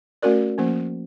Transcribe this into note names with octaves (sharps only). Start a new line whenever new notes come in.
A3 C#4 F#4 A#4 D5
F3 A#3 C#4